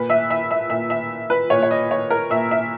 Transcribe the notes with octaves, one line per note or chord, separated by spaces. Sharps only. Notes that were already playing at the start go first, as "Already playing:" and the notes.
Already playing: A#2 B4
E5
E5
E5
A#2 E5
E5
B4
A#2 C#5
C#5
D#5
C#5
A#4
A#2 E5
E5